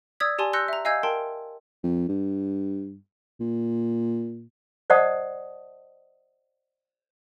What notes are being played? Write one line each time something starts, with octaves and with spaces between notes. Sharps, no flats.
D5 D#6 E6 G#6 B6
G4 D5 G#5 A5 C6
C6 E6 F#6 G6 A#6 C#7
E5 A#5
D#5 F5 G#5 E6 G6 G#6
A#4 G5 A5 C6
F2
G2
A#2
C5 D5 D#5 F#5 A5 D#6